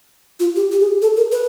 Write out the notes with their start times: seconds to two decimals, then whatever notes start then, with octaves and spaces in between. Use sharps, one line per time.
0.40 F4
0.56 G4
0.72 G4
0.81 G#4
1.02 A4
1.17 A#4
1.32 B4